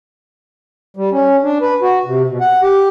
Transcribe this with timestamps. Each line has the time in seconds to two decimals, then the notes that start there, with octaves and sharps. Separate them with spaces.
0.97 G3
1.12 C#4
1.43 D4
1.61 B4
1.82 F#4
2.05 C3
2.29 B2
2.41 F#5
2.62 G4